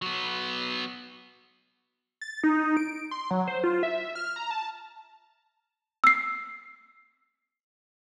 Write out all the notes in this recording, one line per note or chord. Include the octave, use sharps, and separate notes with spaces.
F#3 B3
A6
D#4
D7
C6
F#3
C5
F4
E5
F6
A#5
A5
E6 C7